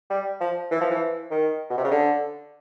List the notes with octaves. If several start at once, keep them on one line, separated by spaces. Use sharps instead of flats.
G3
F3
E3
F3
E3
D#3
B2
C3
C#3
D3